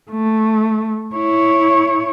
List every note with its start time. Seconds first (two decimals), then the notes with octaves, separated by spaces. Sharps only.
0.11 A3
1.15 E4 C#5